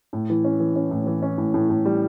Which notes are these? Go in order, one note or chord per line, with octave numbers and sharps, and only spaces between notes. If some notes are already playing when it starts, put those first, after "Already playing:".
A2
E3
C#4
E3
C#4
A2
E3
C#4
A2
A2
A2
G3